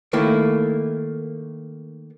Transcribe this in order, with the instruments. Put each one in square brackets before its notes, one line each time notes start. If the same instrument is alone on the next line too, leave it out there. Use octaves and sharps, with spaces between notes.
[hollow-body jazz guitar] D#3 A3 A#3 E4